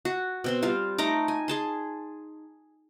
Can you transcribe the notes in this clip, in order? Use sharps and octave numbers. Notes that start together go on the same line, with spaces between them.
F#4
B2 C4 C6
G3 F4 C5 F5
A3 D#4 A#5 D6
G#5
G#4 A5 C6